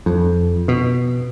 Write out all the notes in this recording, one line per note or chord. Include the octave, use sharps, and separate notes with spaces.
F2
B2